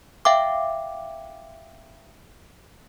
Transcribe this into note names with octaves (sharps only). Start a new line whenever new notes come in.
E5 F5 G5 D6